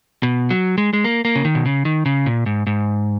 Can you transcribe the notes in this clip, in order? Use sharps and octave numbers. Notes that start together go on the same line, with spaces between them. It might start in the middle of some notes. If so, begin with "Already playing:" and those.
B2
F#3
G#3
G#3
A#3
A#3
C#3
D#3
B2
C#3
D#3
C#3
A#2
G#2
G#2